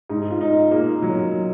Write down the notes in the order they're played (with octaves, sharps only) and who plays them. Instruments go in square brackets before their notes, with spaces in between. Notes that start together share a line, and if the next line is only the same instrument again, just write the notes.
[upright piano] G#2 [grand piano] D#4
[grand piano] F4
[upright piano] D#4
[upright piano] A#3 [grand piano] F4 G#4
[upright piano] F#3